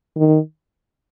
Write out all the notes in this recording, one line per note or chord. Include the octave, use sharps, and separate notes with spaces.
D#3